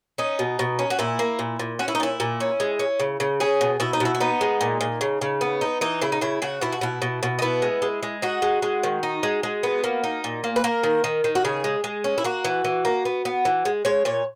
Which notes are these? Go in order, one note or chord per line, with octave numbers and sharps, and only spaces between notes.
C#4 D#4
B2
B2
C#4
F#4
A#2 E4
A#3
A#2
A#2
C#4 F#4
E4
D#4
A#2 E4
A#2
C#4
G#3
C#4
C#3
C#3
C#4 G#4
B2
B2 E4
D#4
B2 E4
E4
B3 D#4
G#3
A#2
A#2
C#3
C#3
B3
D#4
E3 D#4
C#3 E4
D#4
C#3 E4
C#3 F#4
B2 E4
F#4
B2 E4
B2
B2
D#4
B3 E4
G#3
G#3
G#3
D#4 F#4
G#3
G#3
D#3
D#4
G#3
G#3
B3
A#3
D#4
A#2
A#3
B4
A#3 A#4
D#3
D#3
D#3
F#4
C#3 G#4
G#3
G#3
C#4
E4
A#3 F#4
E3
E3
A#3
B3
B3
E3
G#3
G#3 C#5
A#2 C#5